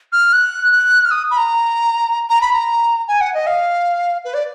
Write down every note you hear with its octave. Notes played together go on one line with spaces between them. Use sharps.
F6
F#6
F#6
F6
D#6
B5
A#5
A#5
B5
A#5
G#5
F#5
D#5
F5
B4
D5